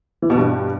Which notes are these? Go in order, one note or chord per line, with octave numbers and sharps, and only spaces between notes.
E3
B2
G2